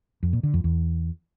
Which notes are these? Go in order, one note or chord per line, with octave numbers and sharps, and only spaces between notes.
F2
A#2
D3
F2
E2